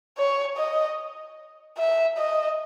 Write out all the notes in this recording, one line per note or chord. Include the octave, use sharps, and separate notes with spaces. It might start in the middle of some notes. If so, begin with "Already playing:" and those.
C#5
D#5
E5
D#5